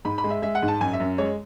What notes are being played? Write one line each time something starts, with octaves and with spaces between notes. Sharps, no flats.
G#2 B5
B5
G#3
E5
G#3 E5
F#5
G#2
A5
F#2 G#5
E5
F#2
G#3 C#5